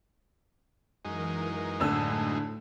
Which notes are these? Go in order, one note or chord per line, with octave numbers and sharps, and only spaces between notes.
F#2 E3 G#3 D#4 A#4
D2 A2 D3 E6